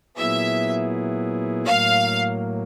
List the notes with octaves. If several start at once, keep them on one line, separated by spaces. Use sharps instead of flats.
A#2 F#3 B3 E4 G#4 E5
A2 F#3 A#3 F5